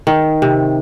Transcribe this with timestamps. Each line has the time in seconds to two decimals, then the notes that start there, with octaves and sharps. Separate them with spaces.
0.07 D#3
0.42 C3